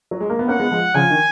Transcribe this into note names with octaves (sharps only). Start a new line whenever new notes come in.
F#3
G#3
A#3
B3
A#3 C#4 F#5
G#3 B3
F3 G#3
C#3 F3 G#5
D#3